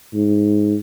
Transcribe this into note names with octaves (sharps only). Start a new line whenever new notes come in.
G#2